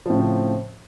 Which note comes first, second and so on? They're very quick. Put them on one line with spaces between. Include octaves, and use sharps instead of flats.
F3 A2 C#3 C4